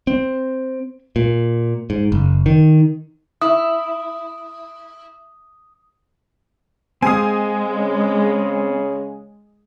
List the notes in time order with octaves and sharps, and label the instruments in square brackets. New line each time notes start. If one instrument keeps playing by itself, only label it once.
[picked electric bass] C4
A#2
G#2
F#1
D#3
[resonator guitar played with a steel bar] E4 [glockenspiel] D#6
[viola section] G#3 [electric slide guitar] C4 F5 [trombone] G#4 [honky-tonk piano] G#5 D#6
[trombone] C#3